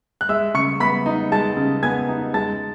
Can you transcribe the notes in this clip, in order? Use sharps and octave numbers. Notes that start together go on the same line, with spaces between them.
F#6
G#3 E5 E6
C#3 C#6 C#7
B3 B5 B6
D#4
G#3 A5 A6
C#3
B3 G#5 G#6
D#4
G#3 A5 A6